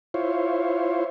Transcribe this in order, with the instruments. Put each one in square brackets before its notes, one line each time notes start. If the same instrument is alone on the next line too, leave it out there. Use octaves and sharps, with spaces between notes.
[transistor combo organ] E4 F4 C5 C#5